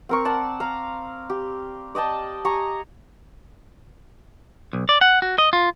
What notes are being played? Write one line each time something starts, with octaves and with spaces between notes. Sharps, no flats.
C4 A#4 C#6
D5 F#5 A5
F5 A#5
G4
D5 D#5 G5 A5
G4 G#5 A#5 C#6
B1
D5
F#5
F#4
D#5
F4